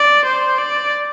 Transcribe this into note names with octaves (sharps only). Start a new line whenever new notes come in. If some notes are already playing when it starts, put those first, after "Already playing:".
Already playing: D5
C5
D5